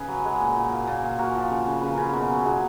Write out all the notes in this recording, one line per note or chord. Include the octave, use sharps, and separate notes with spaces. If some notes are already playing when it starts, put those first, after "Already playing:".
Already playing: C#3 G#4 B4
F#3
G#3
A#2
A#2
A#2
A#2
A#2
A#2 F#4 A#4
F3
C#3
C#3
C#3 B4
C#3 A#4
G#4
B2 F#4 A#4
F#3
B2 F4 G#4